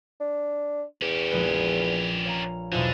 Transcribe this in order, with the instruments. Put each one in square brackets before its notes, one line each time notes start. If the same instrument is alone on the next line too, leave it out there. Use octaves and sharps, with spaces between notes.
[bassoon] D4
[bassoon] E2 [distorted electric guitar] C#4 G4
[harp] A#1 G#3 B4
C#5 F5 A#5
[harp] B1 E2 B2 [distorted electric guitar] D3 [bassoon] F3